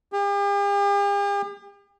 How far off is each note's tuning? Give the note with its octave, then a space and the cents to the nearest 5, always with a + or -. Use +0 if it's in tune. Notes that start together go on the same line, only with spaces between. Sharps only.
G4 +45